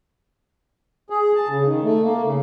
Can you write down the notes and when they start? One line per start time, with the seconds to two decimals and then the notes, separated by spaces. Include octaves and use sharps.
1.10 G#4
1.35 A5
1.49 C#3
1.65 D#3
1.84 A3
2.04 A#3
2.24 C#3